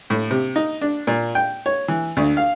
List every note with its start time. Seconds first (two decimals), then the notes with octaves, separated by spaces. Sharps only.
0.10 A2
0.31 C3
0.56 D#4
0.81 D4
1.07 A#2
1.35 G5
1.66 C#5
1.88 E3
2.17 D2
2.37 F5